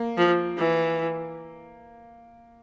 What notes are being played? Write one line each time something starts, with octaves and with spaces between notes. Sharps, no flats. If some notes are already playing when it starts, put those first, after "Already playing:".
Already playing: A#3
F3
E3